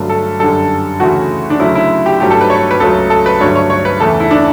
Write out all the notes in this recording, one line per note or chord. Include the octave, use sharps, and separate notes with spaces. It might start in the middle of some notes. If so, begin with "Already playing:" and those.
Already playing: G2 D3 F#3 A3
A4
F#2 D3 G3 A4
D2 C#3 E3 A3 F#4
D4
D2 C#3 F#3 A3 E4
E4
G4
G2 F#3 A3 G4
A4
B4
C#5
B4
C#2 C#3 F#3 A3 A4
A4
B4
G2 D3 F#3 A3 C#5
C#5
C#5
B4
E2 C#3 E3 A3 A4
E4
D4